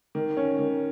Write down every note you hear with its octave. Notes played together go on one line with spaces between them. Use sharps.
D#3
C#4
D#3